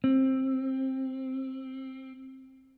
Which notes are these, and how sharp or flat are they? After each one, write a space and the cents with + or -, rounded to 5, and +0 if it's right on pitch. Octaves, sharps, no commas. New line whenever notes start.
C4 +15